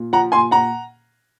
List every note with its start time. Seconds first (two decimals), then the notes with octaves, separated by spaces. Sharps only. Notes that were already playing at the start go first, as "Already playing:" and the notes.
Already playing: A#2
0.13 F3 F#5 A#5
0.32 A#2 G#5 C6
0.51 A#2 F#5 A#5